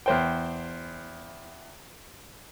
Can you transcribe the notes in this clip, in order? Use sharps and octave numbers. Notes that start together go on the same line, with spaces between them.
E2 C5 G5